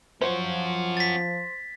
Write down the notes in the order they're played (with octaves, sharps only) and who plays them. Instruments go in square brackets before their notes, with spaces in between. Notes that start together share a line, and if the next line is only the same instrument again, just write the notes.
[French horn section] F3 [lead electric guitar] C#4 F#4 [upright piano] C5
[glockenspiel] A6 B6